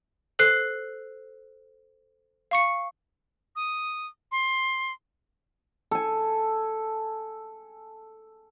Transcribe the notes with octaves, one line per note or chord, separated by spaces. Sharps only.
A4 C5 F#6 C7
F5 C#6 C#7
D#6
C6
A4 G#5